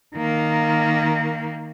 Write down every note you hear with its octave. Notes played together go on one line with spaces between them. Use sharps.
D#3 A#3